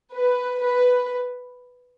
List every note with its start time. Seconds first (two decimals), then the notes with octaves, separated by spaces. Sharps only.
0.14 B4
0.65 B4